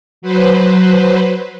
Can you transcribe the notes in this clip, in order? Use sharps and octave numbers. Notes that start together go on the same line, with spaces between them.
F#3 B4 C5